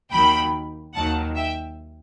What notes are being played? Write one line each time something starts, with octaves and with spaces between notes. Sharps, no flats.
D#2 D#3 F#3 G5 B5
D#2 D#3 F#3 F#5 A5
E5 G5